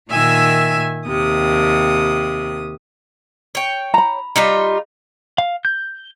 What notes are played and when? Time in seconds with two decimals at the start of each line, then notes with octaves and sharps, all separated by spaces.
0.10 A#2 D#3 E5 G#5 E6
1.07 D#2 C3 D#6
3.55 C#5 G5
3.94 A#5 B5
4.36 G3 D#4 F4
5.38 F5
5.65 G6